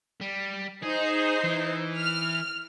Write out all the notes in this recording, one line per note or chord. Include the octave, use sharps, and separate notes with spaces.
G3
D#4 G#4 C5 C7
E3
F6